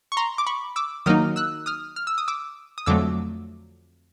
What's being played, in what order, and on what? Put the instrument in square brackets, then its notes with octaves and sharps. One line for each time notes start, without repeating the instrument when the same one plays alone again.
[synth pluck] C#6
A#5 C6
D6
B5 C#6
D6 E6
D#3 F#3 A#3 D#4 D#6 F6
E6 F#6
D#6 F6
F6
E6
D#6
D6 E6
D#6
F2 D3 F#3 A3 D6 E6